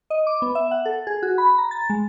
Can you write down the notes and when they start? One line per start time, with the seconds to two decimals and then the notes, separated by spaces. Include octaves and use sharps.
0.10 D#5
0.27 D6
0.42 B3
0.55 E5
0.71 F#5
0.85 A4
1.07 G#4
1.23 F#4
1.38 B5
1.58 A#5
1.71 A6
1.90 G#3